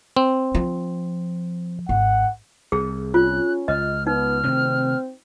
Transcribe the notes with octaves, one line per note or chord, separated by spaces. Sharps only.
C4
F3
G#1 F#5
C2 G#4
C#4 F4 F#6
C#2 D#5 F6
B3 D#4 F6
C3 D#3 A3 C4